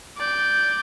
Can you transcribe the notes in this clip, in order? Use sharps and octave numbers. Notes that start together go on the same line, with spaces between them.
D5 G6